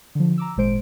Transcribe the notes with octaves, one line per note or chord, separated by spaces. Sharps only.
D3 F3
A#5 D6 E6
G#1 A#2 G#3 C5 D7